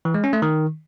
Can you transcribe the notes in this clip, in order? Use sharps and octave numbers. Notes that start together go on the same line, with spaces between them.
E3
G#3
C#4
A3
D#3